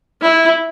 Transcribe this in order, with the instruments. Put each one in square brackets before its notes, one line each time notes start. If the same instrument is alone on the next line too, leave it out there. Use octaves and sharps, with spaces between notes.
[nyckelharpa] E4